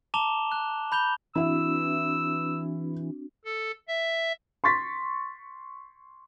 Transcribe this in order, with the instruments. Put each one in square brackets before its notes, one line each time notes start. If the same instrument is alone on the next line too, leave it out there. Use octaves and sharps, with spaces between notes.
[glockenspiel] A5 A#5 D6 E7 F7 G7
F#6
B5 G6 F7 G7
[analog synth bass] E3 [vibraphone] C4 D4 F#4 [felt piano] E4 E5 [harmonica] E6
[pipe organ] A4
E5
[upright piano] C6 C#6 A6 B6